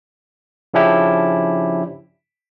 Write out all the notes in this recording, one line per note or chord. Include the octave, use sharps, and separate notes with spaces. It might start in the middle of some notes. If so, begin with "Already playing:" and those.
C#3 F3 C#4 D4 E4 G4